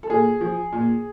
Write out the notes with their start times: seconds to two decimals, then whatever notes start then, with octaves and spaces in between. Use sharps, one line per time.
0.03 A4
0.09 A#2 G#4
0.41 F3
0.72 A#2